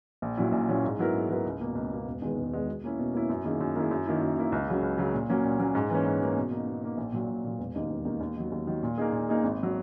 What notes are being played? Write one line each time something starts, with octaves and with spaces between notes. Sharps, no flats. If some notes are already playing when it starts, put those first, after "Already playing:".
A#1
A#2 F#3 C#4 E4
A#1
A#2 F#3 C#4 E4
G#2
F#3 B3 E4 A#4
G#2
F#3 B3 E4 A#4
C#2
B2 A#3
C#2
B2 A#3
E1
E2 D#3 G#3 B3
E1
E2 D#3 G#3 B3
B2
A#3 C#4 E4
B2
A#3 C#4 E4
F#2
D#3 A#3 E4 G#4
F#2
D#3 A#3 E4 G#4
F#2
D#3 A#3 E4
F#2
D#3 A#3 E4
C#2
C#3 F#3
C#2
C#3 F#3
A#2
F#3 A#3 C#4
A#2
F#3 A#3 C#4
G#2
E3 A#3 C#4
G#2
E3 A#3 C#4
B2
A#3 D#4
B2
A#3 D#4
A#1
A#2 F#3
A#1
A#2 F#3
E1
D#2 D#3 A#3 D#4
E1
D#2 D#3 A#3 D#4
D#2
D#3 F#3
D#2
D#3 F#3
A#2
A#3 D#4 G#4
A#2
A#3 D#4 G#4
G#1
F#3